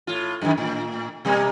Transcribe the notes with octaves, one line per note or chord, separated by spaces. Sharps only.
A2 F4
F#2 D#3
A2
B2 G3 A#3